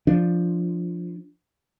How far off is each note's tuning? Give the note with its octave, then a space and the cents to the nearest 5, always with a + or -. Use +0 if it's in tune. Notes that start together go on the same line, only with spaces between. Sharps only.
F3 +0 D4 +0